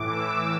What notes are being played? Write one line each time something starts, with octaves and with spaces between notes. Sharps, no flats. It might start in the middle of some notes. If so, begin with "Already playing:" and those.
Already playing: A2 E3 D6
E6